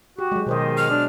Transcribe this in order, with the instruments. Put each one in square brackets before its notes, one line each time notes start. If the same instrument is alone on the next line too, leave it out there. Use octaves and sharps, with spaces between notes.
[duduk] F#4 [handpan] G4
[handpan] F#3 G#3
[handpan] B2 C5 D#5 [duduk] D#3
[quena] F6
[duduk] D4